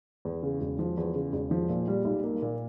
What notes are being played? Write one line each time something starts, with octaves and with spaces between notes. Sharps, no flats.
E2
C#3
E1
F3
E2
C#3
E1
F3
A#2
G3
B1
A#3
A#2